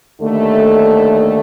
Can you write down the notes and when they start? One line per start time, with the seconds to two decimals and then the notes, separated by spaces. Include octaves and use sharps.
0.21 D#2 D3 A3